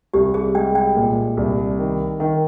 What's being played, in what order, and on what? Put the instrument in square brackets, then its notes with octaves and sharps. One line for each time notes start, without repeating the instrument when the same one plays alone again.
[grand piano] C2 [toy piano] G4
[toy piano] G#4
[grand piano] G#3 [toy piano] G5
[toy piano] G5
[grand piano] A#2
C2
D#3
D#3